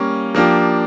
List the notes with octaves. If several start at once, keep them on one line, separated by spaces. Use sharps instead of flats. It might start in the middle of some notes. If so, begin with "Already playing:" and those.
Already playing: G3 A#3 C#4
F3 A#3 D4 G4